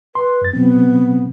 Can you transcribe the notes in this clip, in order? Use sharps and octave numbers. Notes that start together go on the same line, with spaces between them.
B4 C6
F#2 A6
B2 F#3 B3 C4